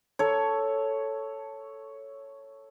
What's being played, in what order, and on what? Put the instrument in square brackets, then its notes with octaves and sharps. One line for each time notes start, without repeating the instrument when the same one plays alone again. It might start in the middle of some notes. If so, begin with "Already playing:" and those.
[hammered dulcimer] A4 C#5